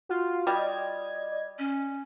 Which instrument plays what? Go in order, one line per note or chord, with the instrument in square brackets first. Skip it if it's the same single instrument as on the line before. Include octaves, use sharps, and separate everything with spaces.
[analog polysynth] F4 F#4
[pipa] G3 [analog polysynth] D5 D#5 G#6
[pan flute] C#4